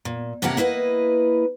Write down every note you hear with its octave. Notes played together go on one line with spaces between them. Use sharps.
A#2
A2 C3 A#3 C#4 A#4 F#5
A#3 E4 B4 D#5